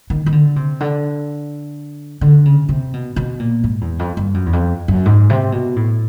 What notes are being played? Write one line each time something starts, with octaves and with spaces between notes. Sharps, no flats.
D#3
D#3
D3
C3
D3
D3
C#3
C3
B2
B2
A#2
G#2
E2
F2
G2
F#2
E2
F2
F#2
G#2
C3
B2
A2